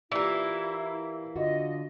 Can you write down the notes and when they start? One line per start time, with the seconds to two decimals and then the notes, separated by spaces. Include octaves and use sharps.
0.12 E3 A#3 E4 F4 G4 D5
1.36 D3 F4 F#4 D#5